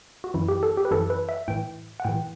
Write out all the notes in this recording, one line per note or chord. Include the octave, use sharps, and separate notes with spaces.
F#4
F#2 E3 E4
G4
A4
G4
B4
F#2 E3 A4
B4
E5
A2 E3 G5
F#5
A2 E3 G5